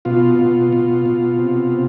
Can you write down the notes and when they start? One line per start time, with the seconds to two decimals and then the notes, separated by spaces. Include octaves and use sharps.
0.05 B2 F4
0.39 B2
0.73 B2
1.06 B2
1.39 C3
1.72 C3